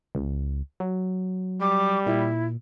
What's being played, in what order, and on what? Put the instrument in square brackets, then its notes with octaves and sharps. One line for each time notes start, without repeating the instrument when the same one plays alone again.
[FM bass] C#2
F#3
[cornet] G3 [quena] D6
[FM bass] A#2 [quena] E4